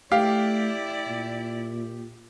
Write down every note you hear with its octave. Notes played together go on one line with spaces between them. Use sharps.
A3 E4 G4 D5 F5
A#2